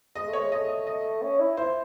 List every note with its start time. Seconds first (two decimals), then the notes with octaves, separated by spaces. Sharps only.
0.15 G#3 D#5
0.28 A3
0.33 C#5
0.40 G#3
0.52 A3 D#5
0.69 D#5
0.87 D#5
1.22 C#4
1.40 E4
1.57 E4 C5